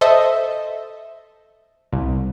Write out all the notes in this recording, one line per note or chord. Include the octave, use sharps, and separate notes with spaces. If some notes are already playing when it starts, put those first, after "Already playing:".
A4 C5 D#5 E5
C2